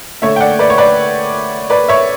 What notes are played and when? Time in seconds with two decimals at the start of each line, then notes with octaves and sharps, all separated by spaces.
0.22 D3 A3 C#5 E5
0.36 G5
0.40 D5 F#5
0.59 B4 D5
0.70 C#5
0.78 B4 D5
1.70 B4 D5
1.88 C#5 E5